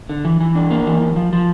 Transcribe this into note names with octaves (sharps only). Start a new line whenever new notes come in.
D3
E3
E3
D4
A#3
E3
E3
F3
F3